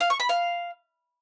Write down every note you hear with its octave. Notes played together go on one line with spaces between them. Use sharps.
F5
C#6
B5
F5